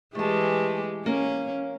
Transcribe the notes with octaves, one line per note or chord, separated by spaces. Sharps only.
E3 G#3 A3 G4 A5
A#3 C#4